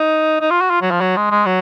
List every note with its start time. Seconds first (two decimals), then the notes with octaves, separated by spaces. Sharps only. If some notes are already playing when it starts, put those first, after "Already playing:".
Already playing: D#4
0.41 D#4
0.50 F4
0.61 F#4
0.70 F4
0.81 F#3
0.91 F3
1.01 F#3
1.16 G#3
1.31 G#3
1.46 F#3